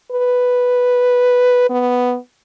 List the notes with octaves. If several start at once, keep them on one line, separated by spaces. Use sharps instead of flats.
B4
B3